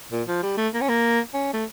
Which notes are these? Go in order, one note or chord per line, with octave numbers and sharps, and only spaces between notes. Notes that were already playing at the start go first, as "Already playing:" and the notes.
A#2
F3
G3
A3
A#3
C#4
A#3
C#4
A3